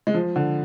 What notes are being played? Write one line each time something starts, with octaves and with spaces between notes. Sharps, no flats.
G#3
F3
D3